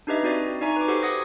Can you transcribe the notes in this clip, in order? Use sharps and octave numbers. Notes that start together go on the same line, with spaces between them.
D4 D#4 G4 B4 D#5 E5
C4 F#4 D5 E5
D#4 D5 E5 G#5 A#5 C#6
B4 D6
F#4 G4 A4 C5 F#5
C5 F#5 D#6 G#6 A#6